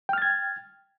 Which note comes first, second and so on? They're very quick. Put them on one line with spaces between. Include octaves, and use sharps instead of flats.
G5 F6 A6 G#6